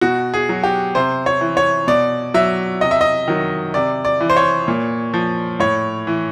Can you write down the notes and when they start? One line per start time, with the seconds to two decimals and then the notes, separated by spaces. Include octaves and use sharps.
0.01 B2 F#4
0.34 G#4
0.49 F#3
0.63 G4
0.95 C3 C5
1.26 C#5
1.41 E3
1.57 C#5
1.88 B2 D5
2.34 F#3 E5
2.81 C3 D#5
2.91 E5
3.01 D#5
3.28 D#3 F#3
3.74 C3 D5
4.05 D5
4.21 E3
4.30 C5
4.36 C#5
4.68 A#2
5.14 F3
5.60 A2 C#5
6.07 E3